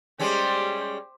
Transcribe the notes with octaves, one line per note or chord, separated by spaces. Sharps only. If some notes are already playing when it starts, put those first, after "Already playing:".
G3 G#3 C#4 G4 C5